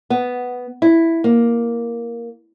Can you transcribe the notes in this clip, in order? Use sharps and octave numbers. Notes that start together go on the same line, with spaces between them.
B3
E4
A#3